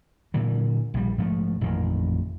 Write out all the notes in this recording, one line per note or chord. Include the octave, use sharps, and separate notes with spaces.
A#2 D3 E3 F#3
A#1 G3
G#2 F3 F#3 A3
A1 F2 A#2 D#3